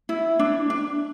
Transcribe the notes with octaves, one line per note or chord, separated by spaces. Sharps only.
E4
D4
D4